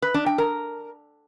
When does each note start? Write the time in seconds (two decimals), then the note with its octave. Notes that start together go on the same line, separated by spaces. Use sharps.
0.02 B4
0.14 D4
0.26 G5
0.38 A#4